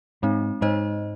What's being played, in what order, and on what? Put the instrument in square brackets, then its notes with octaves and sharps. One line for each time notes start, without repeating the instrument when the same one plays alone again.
[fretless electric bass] G#2 [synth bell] G#3 C4 D#4
[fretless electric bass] G#2 [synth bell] G#3 D#4 C5 D#5